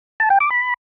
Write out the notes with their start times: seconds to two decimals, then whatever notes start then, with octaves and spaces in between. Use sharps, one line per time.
0.20 A5
0.30 G5
0.40 D6
0.50 B5